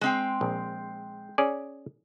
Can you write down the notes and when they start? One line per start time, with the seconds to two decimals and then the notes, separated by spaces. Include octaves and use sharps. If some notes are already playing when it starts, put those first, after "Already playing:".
0.01 G#3 C4 G5
0.41 A#1
1.38 C#4 G#4 D5